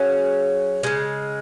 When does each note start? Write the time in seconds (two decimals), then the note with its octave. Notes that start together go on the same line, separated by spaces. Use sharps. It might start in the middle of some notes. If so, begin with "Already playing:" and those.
Already playing: F#3 C#4 G#4
0.83 C#3 F3 G#3